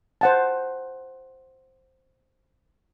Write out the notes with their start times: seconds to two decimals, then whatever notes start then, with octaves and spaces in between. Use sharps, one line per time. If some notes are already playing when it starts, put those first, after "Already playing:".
0.21 C5 F#5 A5